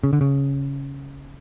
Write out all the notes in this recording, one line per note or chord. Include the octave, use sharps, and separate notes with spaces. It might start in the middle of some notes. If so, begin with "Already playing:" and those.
C#3
D3
C#3